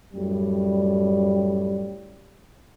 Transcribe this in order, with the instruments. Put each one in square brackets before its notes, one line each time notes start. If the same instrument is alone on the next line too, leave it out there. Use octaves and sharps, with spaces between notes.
[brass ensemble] F#2 A2 G3